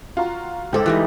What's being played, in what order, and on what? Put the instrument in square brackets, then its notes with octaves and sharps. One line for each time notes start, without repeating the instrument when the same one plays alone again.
[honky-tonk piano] F4 F#4 A#5
[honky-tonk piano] C#2 C5 D6 [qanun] D#4 A4
[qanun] E3 G3 D#4